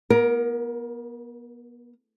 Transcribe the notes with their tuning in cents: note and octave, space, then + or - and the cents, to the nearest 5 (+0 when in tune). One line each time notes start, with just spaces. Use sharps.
B3 -35 A#4 +15